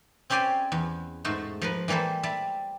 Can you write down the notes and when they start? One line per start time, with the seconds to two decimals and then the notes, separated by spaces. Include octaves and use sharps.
0.30 C4 C#4 G4 C5 D5 G#5
0.72 E2
1.25 G#2 A3 F#4 C5
1.62 F3 A#4 B4
1.88 E3 G3 A#3 A4 C5
2.23 G3 E5 A5